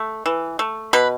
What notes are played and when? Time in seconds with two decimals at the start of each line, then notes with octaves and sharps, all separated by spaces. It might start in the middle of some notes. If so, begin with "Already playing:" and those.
Already playing: A3
0.26 E3
0.59 A3
0.93 B2 B4